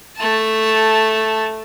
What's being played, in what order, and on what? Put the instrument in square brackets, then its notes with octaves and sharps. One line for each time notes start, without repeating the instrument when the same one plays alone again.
[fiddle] A3 A5